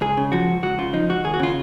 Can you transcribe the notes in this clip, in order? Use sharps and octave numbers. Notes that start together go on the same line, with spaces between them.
C#2 G#4
C#3
F3 F#4
C#2
C#2 F#4
C#3 F4
F3 D#4
C#2 F#4
D#2 G#4
F#4
C#3 F4